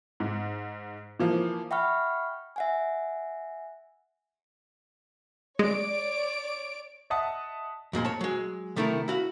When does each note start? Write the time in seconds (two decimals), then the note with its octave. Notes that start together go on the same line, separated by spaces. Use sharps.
0.20 G#2
1.19 E3 F3 A#3
1.71 E5 F#5 G5 B5 C#6 F6
2.56 E5 F#5 G#5
5.59 G#3 C#5 D5 D7
7.10 D#5 E5 F#5 A5 D#6
7.93 F2 A#2 G#3 C6
8.05 C#5 A5
8.21 F#3 G#3
8.76 C3 D#3 A3 B3 E4 A#4
9.08 E4 F#4 F5